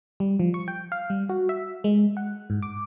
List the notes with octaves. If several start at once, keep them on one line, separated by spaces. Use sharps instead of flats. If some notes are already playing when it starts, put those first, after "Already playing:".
G3
F3
C#6
G5
F5
G3
F#4
E5
G#3
F#5
G#2
D6